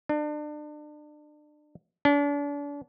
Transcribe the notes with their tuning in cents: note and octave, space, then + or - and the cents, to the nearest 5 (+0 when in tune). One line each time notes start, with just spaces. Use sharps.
D4 +35
D4 -35